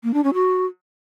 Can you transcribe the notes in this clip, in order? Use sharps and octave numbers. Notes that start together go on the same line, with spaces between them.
A#3
D4
C#4
F#4